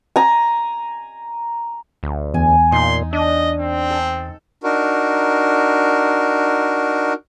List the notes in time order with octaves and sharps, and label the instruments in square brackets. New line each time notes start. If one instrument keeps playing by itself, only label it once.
[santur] G#5 A#5
[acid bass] D2
[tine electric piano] E2 [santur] G#5
[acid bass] A#2 [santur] D#4 [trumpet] C6
[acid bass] D4 [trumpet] D#5
[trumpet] C4
[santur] A4
[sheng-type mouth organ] D4 D#4 F#4 A#4